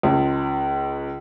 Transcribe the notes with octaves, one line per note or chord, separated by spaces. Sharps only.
C#2